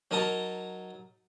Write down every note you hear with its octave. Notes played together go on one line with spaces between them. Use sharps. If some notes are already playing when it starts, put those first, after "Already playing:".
F#3 D#4 A#4 D#5 A5 A#5